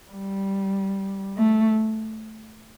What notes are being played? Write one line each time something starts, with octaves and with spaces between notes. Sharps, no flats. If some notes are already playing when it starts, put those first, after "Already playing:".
G3
A3